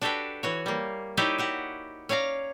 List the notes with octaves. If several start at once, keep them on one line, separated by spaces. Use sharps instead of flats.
D4 F#4 G4 A4 B4 G5
E3 F#4 C#5
G3 A#3
D#4 E4 G4 C#5 D5
F#4 G4 F#5
C#4 C#5 D5 F5 A#5